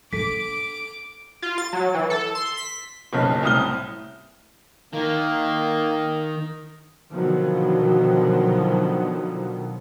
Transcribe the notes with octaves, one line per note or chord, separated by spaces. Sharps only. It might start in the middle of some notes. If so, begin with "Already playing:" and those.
D4 A4 D6 B6
F4
A6
F#3
E3
A4
C6
B6
F#1 B1 C#3
C2 A2 D#6 F6 G7
D#3 A#3
B2 D3 D#3 F3 F#3 B3